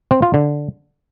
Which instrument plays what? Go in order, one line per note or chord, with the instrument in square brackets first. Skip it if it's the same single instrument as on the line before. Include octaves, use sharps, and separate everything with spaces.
[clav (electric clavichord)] C4
F4
D3